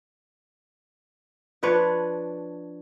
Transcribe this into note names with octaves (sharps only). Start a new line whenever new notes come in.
F3 D4 B4 C#5